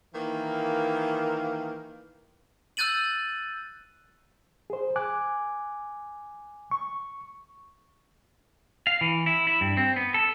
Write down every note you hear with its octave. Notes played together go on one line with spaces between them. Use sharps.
D#3 E3 A#3
E6 F#6 G6 A6 D#7 F#7
G#4 C5
G#5 D6 F#6
C#6
F5
E3
E4
E4
G2
C4
B3
A4